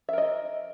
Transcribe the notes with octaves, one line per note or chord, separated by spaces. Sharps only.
A#4 D#5 E5